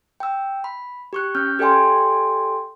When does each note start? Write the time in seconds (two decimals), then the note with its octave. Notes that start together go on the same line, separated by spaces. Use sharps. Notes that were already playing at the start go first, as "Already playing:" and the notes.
0.20 G5 E6
0.64 B5
1.13 G4 C#6 F#6
1.35 C#4 F6 G6
1.59 G4 A4 D5 G5 G#5 C6